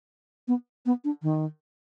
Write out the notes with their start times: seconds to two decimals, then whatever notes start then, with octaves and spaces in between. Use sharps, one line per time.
0.48 B3
0.86 B3
1.04 D4
1.23 D#3